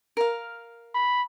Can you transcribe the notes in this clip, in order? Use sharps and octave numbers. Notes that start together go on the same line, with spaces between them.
A#4 F5
B5